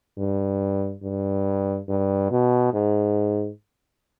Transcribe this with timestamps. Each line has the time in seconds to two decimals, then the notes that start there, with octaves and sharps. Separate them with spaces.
0.18 G2
1.03 G2
1.89 G2
2.31 B2
2.74 G#2